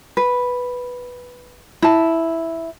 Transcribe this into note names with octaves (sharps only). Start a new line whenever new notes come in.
B4
E4 A5